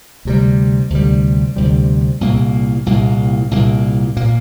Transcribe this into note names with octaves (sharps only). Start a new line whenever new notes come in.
D2 C3 G3
D2 C3 G3
D2 C3 G3
C2 A#2 A#3
C2 A#2 A#3
C2 A#2 A#3
A#2 A#3